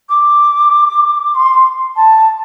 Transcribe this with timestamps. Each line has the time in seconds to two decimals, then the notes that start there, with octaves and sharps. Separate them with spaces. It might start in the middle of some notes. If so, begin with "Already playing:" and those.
0.09 D6
1.34 C6
1.95 A5